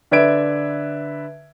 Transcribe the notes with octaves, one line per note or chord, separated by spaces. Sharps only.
D3 B4 D5 E5 G#6 D7